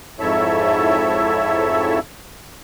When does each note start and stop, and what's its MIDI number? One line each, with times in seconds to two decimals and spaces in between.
0.20 1.99 41
0.20 1.99 44
0.20 1.99 64
0.20 1.99 69
0.20 1.99 73
0.20 1.99 76